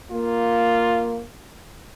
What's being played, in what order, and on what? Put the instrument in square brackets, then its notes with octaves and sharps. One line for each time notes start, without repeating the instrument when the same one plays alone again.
[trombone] A#3 [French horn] F4